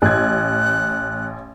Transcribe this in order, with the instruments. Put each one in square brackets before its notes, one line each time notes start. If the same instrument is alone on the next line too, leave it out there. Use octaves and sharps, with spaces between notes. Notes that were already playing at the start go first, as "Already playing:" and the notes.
[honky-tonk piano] A1 G#6 [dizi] F#6